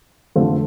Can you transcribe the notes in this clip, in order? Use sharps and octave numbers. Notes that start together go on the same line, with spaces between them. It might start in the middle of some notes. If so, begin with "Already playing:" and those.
F2 D3 A3 C4 F4